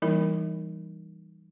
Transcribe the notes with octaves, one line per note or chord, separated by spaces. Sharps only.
E3 G3 A#3 D#4 E4 A#4